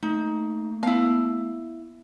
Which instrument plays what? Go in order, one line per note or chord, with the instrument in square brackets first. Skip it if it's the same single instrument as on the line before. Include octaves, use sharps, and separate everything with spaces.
[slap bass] A3 A#3 [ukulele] D#4
[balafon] B3 [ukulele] E4 F5